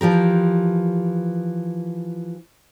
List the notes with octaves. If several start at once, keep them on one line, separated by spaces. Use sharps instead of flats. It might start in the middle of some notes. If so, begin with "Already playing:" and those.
E3 F3 G4 A#4